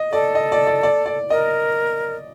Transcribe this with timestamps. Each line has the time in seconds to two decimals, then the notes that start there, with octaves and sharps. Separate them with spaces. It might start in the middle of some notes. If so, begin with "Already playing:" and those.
Already playing: D#5
0.12 A4 D5
0.35 D#5
0.52 D5
0.67 D5
0.83 D5
1.06 D5
1.30 A#4 D#5